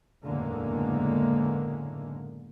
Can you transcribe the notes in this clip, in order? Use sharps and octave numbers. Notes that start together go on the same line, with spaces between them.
F#1 E2 A2 D3 G#3 A#3